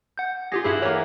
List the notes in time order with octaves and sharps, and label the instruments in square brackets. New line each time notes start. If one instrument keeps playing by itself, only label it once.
[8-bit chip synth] F#5 G6
[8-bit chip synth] F4 G4 A#6 [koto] G#4
[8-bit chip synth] G2 G4 G#4 [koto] E4 C5 F#5
[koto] E3 A#3 [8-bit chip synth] C#5